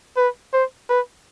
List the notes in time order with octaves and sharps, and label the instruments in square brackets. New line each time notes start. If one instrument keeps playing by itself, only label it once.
[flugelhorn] B4
C5
B4